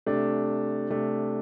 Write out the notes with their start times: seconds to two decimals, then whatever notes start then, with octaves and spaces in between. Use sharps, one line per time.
0.06 C3 A3 D4
0.90 C3 A3 D4